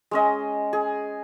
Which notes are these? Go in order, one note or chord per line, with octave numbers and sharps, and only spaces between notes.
G#3 C#4 D#5
G#4